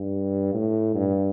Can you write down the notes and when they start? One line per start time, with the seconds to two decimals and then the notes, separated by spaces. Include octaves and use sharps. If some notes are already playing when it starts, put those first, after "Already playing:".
Already playing: G2
0.54 A2
0.94 G2